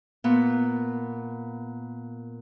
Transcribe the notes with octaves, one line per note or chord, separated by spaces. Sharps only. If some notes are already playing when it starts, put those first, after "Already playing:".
A#2 B3